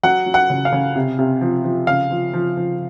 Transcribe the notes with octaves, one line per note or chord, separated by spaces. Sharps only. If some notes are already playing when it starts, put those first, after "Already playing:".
F#3 F#5
F#3
F#5
C#3
F5
C#3
C3
C3
F3
F3
C#3 F5
F3
F3
F3